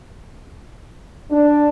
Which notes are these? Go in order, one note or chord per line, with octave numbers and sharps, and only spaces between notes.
D4